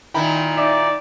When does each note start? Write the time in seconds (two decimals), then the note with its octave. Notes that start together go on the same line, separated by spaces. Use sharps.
0.14 A#2 D#3 E4 G5 A#5 B5
0.57 D#4 D5 E5